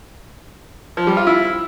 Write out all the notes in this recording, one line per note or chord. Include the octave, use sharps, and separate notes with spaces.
F3
G3
F4
E4